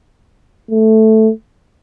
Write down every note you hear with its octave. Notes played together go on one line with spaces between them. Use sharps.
A3